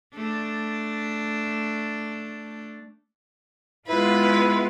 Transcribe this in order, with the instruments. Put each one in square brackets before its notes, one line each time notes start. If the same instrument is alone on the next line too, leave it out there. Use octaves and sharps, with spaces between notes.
[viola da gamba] A3 D4
[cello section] G#3 B3 F4 [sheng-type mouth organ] E4 [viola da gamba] B4